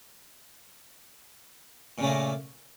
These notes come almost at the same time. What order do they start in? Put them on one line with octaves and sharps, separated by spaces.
A#2 C#3 A3 A#3